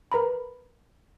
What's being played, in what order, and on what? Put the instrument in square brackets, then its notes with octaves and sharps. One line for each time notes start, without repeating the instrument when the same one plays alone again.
[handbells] A#4 B4 A#5 B5